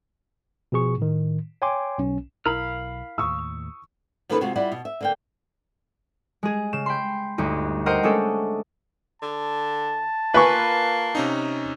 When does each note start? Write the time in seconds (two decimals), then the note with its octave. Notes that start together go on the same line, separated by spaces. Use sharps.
0.72 B2 F3 G#4 C#6
0.98 A2 D#3
1.62 C#5 G5 G#5 C6 D6
1.98 B1 C#4
2.46 B1 E4 A#4 F5 B5 F6
3.18 D#2 A2 C#6 D#6 E6
4.29 D#3 F3 A#3 C#4 A4 B4
4.41 C3 G#3 F4 F#4
4.56 G3 E4 F4 D5 F#5
4.72 B2
4.85 E5
5.01 D3 A#3 G5
6.43 G#3 G#4
6.73 C#3 E7
6.86 G5 B5 C6
7.38 G1 D2 D#4
7.86 A#4 C5 D#5 F#5 G5
8.03 G#3 A3 C#4 D4 G#4 A4
9.22 D3 A5
10.34 A#3 F4 B4 G#5 C#6
11.15 C3 C#4 D#4